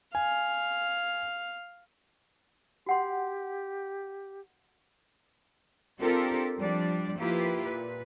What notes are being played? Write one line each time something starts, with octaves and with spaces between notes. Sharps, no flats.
F5 G#5
F#4 G4 F#5 C6
C4 D4 F4 G4 A4 A#4
F3 G3 D4 D5
F3 A#3 E4 F4 G4 B4
A#2 B4